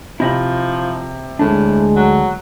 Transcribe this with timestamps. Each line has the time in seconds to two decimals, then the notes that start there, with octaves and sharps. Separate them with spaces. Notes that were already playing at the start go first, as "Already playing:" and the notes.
0.20 C3 F3 E4 D#5 B5
1.39 D2 A2 G#3 D4
1.96 F#3